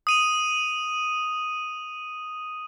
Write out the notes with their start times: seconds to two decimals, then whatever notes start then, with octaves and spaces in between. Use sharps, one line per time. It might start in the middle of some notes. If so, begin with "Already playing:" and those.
0.07 D#6 D#7 F7